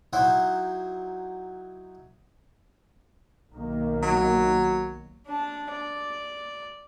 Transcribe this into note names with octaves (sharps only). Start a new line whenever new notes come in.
F#3 D#4 E4 C5 F#5
B1 D#3 A#3
F#3
D4 A5
D5